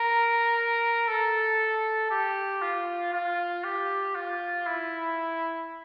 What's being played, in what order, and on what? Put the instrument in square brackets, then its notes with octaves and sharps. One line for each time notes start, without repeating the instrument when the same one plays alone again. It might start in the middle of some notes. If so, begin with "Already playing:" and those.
Already playing: [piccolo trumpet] A#4
A4
G4
F4
F4
G4
F4
E4